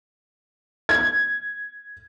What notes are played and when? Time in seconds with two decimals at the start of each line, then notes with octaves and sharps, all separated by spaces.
0.89 G#6